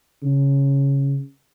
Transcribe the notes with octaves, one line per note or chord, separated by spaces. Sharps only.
C#3